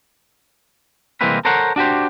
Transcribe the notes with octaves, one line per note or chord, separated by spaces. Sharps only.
C2 E3 G#3 A#3 C4 B4
A4 A#4 C5 C#5 F#5
D4 F#4 G4 C5